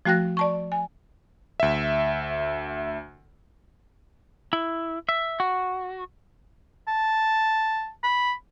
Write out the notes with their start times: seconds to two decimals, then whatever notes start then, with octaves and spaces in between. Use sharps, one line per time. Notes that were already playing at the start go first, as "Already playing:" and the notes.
0.05 F3 A3 F#4 G5 F#6 A#6
0.37 D5 A5 C#6
0.72 G#5
1.60 D2 E5
4.53 E4
5.09 E5
5.40 F#4
6.88 A5
8.03 B5